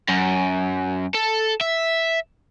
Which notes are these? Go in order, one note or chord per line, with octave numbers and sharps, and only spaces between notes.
F#2
A4
E5